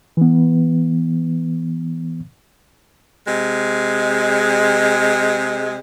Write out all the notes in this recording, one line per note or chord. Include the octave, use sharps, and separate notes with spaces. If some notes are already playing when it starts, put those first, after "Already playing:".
E3 B3
C3 G#3